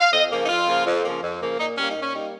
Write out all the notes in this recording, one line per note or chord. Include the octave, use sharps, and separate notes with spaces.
F5
F2 D#5
C#3 F3 A#3
D#4
F2 F4
C#3 F3 A#3
F2
C#3 F3 A#3
F2
C#3 F3 A#3
A#2 D#4
G3 A#3 C#4
D#4
A#2
C#4
G3 A#3 D#4